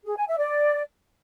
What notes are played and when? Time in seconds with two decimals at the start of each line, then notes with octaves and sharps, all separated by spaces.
0.05 G#4
0.16 G#5
0.27 E5
0.39 D5